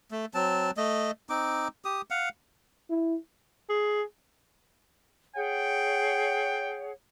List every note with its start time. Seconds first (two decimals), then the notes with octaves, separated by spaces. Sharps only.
0.11 A3
0.34 F#3 C4 A5
0.77 A3 D#5
1.30 C4 D#4 D6
1.85 G4 D#6
2.10 F5 F#5
2.90 E4
3.70 G#4
5.36 G#4 C#5 F#5 G5